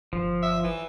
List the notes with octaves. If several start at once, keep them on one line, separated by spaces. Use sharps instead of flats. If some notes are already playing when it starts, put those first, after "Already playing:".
G1 F3
E5
E3